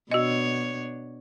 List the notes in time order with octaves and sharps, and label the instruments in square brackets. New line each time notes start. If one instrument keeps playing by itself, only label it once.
[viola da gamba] B2 D4 C#5 [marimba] F#4 D#5